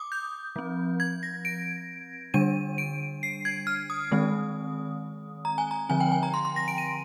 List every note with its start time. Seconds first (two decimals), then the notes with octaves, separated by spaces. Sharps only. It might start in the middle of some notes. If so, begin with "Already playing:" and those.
Already playing: D6 D#6
0.12 G6
0.56 F3 C4
1.00 G#6
1.23 A#6
1.45 D7
2.34 D3 G3 D4 D#7
2.78 D7
3.23 C7
3.45 G#6
3.67 F6
3.90 D#6
4.11 D#3 G#3 C4
5.45 A#5
5.58 G#5
5.71 A#5
5.89 D3 F3 C4 G#5
6.00 G5
6.12 G#5
6.23 A#5
6.34 C6
6.45 C6
6.56 A#6
6.68 D7
6.78 D#7